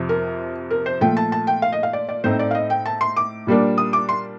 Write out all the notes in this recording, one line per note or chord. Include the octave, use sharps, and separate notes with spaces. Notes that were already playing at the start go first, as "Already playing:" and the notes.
Already playing: F2 C3 F3
A#4
A#4
C5
A#2 F3 A3 G5
A5
A5
G5
F5
D#5
F5
D5
D5
A2 A3 C4 D#4 C5
D5
F5
D#5
G5
A5
C6
D6
A#2 G3 A#3 D4
D#6
D6
C6